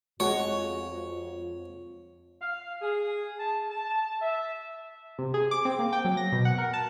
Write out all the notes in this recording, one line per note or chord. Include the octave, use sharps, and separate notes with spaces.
F2 G#3 F4 F#4 C#5
F5
G#4
A5
A5
E5
C3
G#4
D6
C4
A#3
G5
F#3
A#6
B2
F#5
A#4
A5